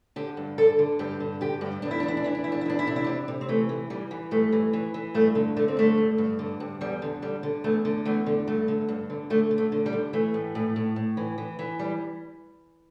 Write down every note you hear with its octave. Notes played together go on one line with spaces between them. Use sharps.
D3 G4
G2
D3 A4
D3
G2 G4
D3
D3 G4
G2
E2 D4
E4
E3 D4
E4
D4
E3 E4
D4
E2 E4
D4
E4
E2 D4
E4
C3 D4
E4
C3 D4
C3
C4
E3 A3
E3
E3 G3
E3
G2 A3
E3
E3
E3
G2 A3
D3
D3 A3
C4
G2 A3
G2
G2
D3
G2
E2 G3
D3
D3 G3
D3
E2 A3
D3
E2 A3
D3
G2 A3
D3
G2
D3
D3 A3
D3
A3
D3
G3
D3
E3 A3
A2
A2
A2
A2
E3
E3
E3
G3